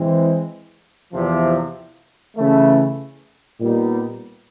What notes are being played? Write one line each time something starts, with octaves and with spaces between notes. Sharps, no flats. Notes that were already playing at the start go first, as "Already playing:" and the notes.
Already playing: E3 G#3 C4
E2 C3 F3
C#3 E3 A3
A#2 G3 B3 D#4